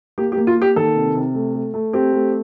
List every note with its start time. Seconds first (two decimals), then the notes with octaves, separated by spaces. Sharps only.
0.18 A#3 G4
0.32 G4
0.37 A#3
0.47 F4
0.57 A#3 G4
0.76 D#3 A4
0.96 C3
1.15 C3
1.35 A3
1.55 A3
1.74 A3
1.93 C4 G4
2.13 A3